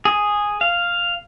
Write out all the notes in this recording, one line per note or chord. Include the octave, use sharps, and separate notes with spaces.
G#4
F5